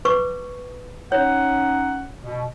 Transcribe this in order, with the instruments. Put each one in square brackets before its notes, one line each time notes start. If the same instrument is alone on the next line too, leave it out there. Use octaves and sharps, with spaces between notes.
[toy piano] B4 C#6 D6
[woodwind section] C#4 D#4 F#5 [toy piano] C#5
[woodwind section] B2